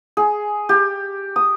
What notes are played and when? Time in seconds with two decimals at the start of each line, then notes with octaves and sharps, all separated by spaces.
0.17 G#4
0.69 G4
1.36 D#6